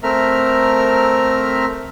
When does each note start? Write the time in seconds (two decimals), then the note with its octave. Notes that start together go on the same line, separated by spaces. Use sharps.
0.03 A3 C4 A#4 E5 A#5 F6